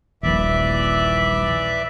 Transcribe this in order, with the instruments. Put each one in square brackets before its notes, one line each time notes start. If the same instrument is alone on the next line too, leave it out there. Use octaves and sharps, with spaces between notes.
[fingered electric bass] D#1 A#1 [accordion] E3 D5 [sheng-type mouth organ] E5